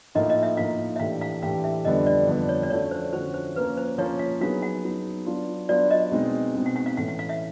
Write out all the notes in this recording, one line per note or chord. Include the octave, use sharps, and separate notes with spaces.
A2 F3 A#3 D#4 D#5
D#5
E5
A2 F3 A#3 D#4 F5
E5
A2 E3 A3 D4 G4 F5
F5
A2 E3 A3 D4 G4 F5
E5
F2 D3 G3 B3 D4 D#5
D5
F2 D3 G3 B3 D4
C#5
D5
D3 F3 A3 C#4 F#4 C#5
C5
D3 F3 A3 C#4 F#4 C5
C5
F3 A#3 C#4 B4
C5
F3 A#3 C#4 C#5
F5
F#3 B3 D#4 G#4 F5
F#5
F#3 B3 D#4 G#4
F#3 B3 D4 F4
F#3 B3 D4 F4 D5
D#5
B2 G#3 C4 D#4
B2 G#3 C4 D#4
F#5
F#5
F5
A2 E3 A3 C#4 F#5
F#5
F5
E5